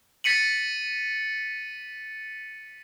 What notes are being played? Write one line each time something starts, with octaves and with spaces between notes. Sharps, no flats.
A6 B6 C#7 D#7 F#7